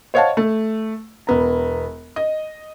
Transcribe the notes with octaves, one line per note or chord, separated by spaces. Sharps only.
C5 C#5 D#5 F5 F#5 A5
A3
E1 B3 A#5
D#5